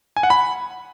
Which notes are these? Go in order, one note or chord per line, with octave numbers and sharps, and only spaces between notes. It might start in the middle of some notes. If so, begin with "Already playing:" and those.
G#5
F#5
B5